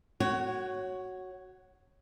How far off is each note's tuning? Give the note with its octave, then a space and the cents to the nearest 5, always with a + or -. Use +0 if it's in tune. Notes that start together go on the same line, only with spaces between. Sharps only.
F#4 +0 C#5 +0 F#5 +35